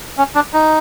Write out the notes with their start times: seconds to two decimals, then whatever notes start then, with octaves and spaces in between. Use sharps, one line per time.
0.18 C#4
0.35 D4
0.53 D#4